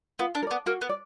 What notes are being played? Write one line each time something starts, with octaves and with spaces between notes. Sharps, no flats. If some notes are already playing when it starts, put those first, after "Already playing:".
B3 F4
D4
A#4
B3 D5
A#3 F#4
B3
D5